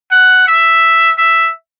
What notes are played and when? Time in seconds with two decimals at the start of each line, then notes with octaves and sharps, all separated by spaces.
0.12 F#5
0.47 E5
1.18 E5